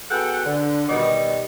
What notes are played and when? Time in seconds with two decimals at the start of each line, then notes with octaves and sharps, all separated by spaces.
0.11 B3 F#4 G#4 A4 F#5 G5
0.45 D3
0.89 B2 D#3 G3 D#4 D5